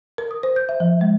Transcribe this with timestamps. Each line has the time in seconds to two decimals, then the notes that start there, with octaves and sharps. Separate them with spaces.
0.18 A#4
0.31 D#6
0.43 C5
0.56 G6
0.69 E5
0.80 F3
1.01 G#3